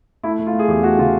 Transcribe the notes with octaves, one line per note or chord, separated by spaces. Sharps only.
A3 E4
A3
F4
A3
G#4
E2 G4
A3 F#4
C#3 F4